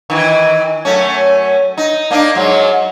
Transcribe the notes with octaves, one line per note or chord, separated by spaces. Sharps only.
D#3 E3
F#2 A3 C#4
D#4
A#3 D4 D#4
G#2 F#3